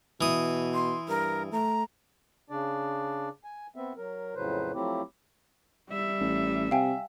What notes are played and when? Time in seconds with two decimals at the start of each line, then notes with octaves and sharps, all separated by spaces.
0.21 B2 E3 D#6
0.74 C6
1.08 G2 A#4
1.52 A3 A#5
2.50 C#3 D4 D5
3.44 G#5
3.76 B3 C4 E5
3.97 F#3 A#4
4.35 F2 A2 C#3 F#3 B4 C5
4.74 F3 F#3 A3 C4 E4 G4
5.90 G3 E5
6.21 A1
6.71 C3 F5 G5 G#5